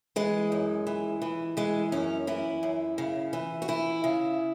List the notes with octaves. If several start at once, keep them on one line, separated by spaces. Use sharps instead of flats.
E3 G#3
F#2
E3
E3
E3 G#3
F#2 C#4
E3 E4
F#2
C#3
E3
F#4
E3 E4
C#3